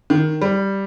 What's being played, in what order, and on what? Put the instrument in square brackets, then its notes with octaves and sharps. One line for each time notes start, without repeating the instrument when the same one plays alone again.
[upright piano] D#3
G3